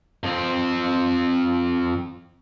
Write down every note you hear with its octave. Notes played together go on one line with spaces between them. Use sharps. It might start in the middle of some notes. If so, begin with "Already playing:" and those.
F2 C4